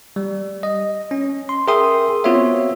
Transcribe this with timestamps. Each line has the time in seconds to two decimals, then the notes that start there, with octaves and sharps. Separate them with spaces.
0.16 G3
0.63 D#5
1.11 C#4
1.49 C6
1.68 G#4 A#4 E5 G5 C6 D#6
2.24 B3 C4 F4 F#4 C#5 E5